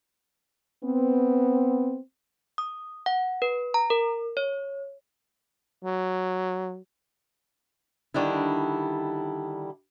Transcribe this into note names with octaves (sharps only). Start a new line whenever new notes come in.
B3 C4
D#6
F#5
B4
A#5
A#4
C#5
F#3
D3 D#3 G3 D4 E4